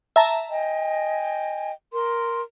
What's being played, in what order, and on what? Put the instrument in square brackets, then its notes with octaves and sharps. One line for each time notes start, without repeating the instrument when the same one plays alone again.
[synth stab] E5 A5 A#5
[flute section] D#5 G5 G#5
A#4 C6